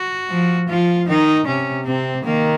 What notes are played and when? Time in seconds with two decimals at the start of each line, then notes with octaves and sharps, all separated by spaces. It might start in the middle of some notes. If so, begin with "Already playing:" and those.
Already playing: F#4
0.30 F3
0.69 F3 F4
1.08 D#3 D#4
1.47 C3 C#4
1.86 C3 C4
2.25 D#3 A#3